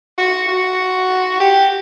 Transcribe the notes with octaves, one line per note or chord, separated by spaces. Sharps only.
F#4
F#4
G4